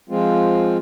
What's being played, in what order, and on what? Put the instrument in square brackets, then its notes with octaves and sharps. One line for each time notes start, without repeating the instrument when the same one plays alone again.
[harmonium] F3 G#3 C4 F4